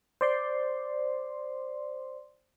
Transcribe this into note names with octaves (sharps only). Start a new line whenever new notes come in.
C5 D5 C6